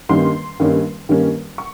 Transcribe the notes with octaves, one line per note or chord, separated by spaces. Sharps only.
G2 D#3 G3 A#3 C#4 C6
G2 D#3 G3 A#3 C#4
G2 D#3 G3 A#3 C#4
C#6